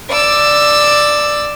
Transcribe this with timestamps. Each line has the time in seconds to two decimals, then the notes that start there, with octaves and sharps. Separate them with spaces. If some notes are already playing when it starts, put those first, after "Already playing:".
0.10 D5 E6